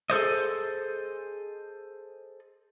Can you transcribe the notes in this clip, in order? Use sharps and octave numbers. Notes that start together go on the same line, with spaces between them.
G#4 A4 C5 D#5